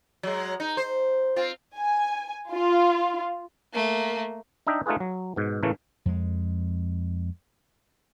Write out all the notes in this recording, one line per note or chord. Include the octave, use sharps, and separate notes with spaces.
F#3 G#3
D#4
C5
C4 F4
G#5
F4
A3 A#3
D4 D#4 D#5 E5 G5
A3 D#4 F4 F#4 G#4 B4
F#3
G#2 B2
A2 C#3 E3 A3 A#3 C#4
F2 G#3